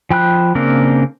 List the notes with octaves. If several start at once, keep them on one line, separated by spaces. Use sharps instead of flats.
F3 G5 B5 F#6
C#3 A#3 C4 D4 A#4